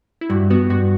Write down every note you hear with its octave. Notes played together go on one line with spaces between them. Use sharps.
E4
G2 F#4
B3 F#4
G2 F#4